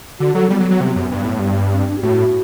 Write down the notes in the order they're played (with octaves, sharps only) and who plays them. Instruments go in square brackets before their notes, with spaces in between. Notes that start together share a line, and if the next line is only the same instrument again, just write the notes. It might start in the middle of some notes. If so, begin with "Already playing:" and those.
[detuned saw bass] D3 [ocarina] F#4
[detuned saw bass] F#3 [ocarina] A4
[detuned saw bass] G3 [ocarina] B3
[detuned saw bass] F#3
F#3
C3
F#2
G2
A2
G2
[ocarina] C4
D4
G4
[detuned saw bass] A2 [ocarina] F#4